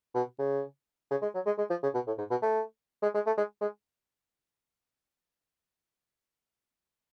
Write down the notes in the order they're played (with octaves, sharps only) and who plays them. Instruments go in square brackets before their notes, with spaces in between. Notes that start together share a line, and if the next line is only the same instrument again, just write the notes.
[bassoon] B2
C#3
C#3
G#3
F#3
G#3
G#3
F3
C#3
B2
A2
G#2
B2
A3
G#3
G#3
A3
G#3
G#3